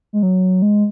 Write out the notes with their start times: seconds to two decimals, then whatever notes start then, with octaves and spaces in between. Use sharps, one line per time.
0.13 G#3
0.23 F#3
0.62 G#3